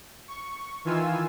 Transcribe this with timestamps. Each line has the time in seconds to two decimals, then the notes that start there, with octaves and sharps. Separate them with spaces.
0.28 C#6
0.85 D#3 E3 F4 G#5 E6